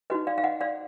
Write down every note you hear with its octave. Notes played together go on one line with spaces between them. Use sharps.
D#4 F#4 B4 D#5
D5 F5
F5
D#5 F#5
D5 F5